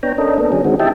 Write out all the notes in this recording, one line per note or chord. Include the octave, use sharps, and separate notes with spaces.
B3 D4 C#5 G5 A#5
C#4 D4 A4 A#4 D#5
A#3 B3 D4 A4
D3 F#3 C#4 G#4
D#3 G#3 C4 F#4
E4 G4 D#5 E5 G5 A5